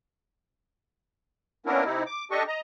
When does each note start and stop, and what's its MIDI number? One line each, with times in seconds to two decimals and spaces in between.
1.66 1.84 58
1.66 1.84 59
1.66 1.84 61
1.66 1.84 62
1.66 1.84 64
1.66 1.84 70
1.85 2.03 48
1.85 2.03 63
1.85 2.03 64
2.06 2.25 86
2.31 2.43 62
2.31 2.43 67
2.31 2.43 69
2.31 2.43 75
2.31 2.43 85
2.48 2.60 75
2.48 2.60 82